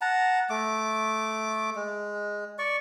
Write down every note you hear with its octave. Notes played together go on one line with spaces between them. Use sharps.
F#5 A5 A#5
A3 D6
G#3
D5 C#6